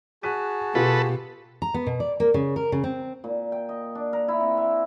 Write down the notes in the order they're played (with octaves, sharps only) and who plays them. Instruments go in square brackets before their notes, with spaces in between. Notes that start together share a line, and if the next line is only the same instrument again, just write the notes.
[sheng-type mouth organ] F#4 G#4 A5 [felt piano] F#6 B6 D#7
[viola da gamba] B2 [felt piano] F4 G4 [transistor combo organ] A4 B4
[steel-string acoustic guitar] A#5
B3
B2
D5
A#3
C#3
A#4
C#3
C4
[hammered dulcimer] A#2
G5
D#5
D4
A#4
E4
C4
E5